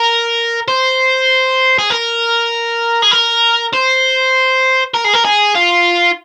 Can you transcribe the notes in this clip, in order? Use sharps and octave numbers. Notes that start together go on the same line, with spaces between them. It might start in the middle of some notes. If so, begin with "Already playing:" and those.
Already playing: A#4
C5
G#4
A#4
G#4
A#4
C5
A#4
G#4
A#4
G#4
F4